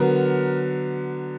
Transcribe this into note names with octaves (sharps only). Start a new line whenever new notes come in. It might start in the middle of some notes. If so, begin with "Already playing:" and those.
Already playing: D3 F#3 B3 A#4